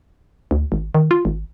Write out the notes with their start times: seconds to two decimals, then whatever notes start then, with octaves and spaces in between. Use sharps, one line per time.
0.51 D2
0.72 G#1
0.95 D#3
1.11 F4
1.25 G#1